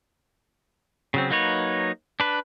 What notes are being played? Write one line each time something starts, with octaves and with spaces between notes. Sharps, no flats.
C#3 F#3 C4
F#3 A#3 D#4 B4 C#5
D4 B4